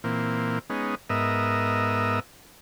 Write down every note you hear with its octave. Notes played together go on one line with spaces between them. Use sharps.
A#2 E3 A#3 C4
G#3 B3 C#4 D#4
G#2 B3 A#4 D#5 E5